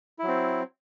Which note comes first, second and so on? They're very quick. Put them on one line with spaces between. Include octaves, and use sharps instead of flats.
E4 F#3 C4